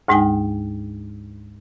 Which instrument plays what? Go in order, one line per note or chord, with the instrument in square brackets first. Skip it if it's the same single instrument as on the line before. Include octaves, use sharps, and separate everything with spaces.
[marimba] D2 G#2 G#3 D#4 G5 G#5